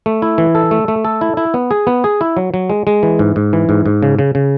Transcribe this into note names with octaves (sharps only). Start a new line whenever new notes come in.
A3
E4
E3
A4
A3
A3
A4
E4
E4
B3
G#4
B3
G#4
E4
F#3
F#3
G#3
G#3
E3
G#2
G#2
E3
G#2
G#2
C#3
C#3
C#3